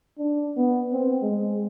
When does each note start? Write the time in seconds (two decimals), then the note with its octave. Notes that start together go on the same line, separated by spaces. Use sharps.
0.18 D4
0.57 B3
0.93 C4
1.22 G#3